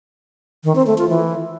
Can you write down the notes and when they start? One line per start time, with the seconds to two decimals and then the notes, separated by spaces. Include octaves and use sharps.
0.64 D#3
0.75 C4
0.87 A3
0.98 F4
1.09 E3